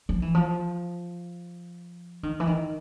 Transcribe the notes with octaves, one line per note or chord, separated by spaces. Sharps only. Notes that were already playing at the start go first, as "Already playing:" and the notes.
F3
E3
F3
D#3
E3
D#3